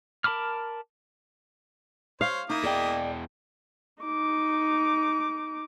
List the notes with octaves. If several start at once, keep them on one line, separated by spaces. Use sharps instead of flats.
A#4 A5 B5 D6 F6
C5 C#5 F5
A#3 D#4 E4 D#6
E2 G#4 D5 D#5 G5
D#4 D6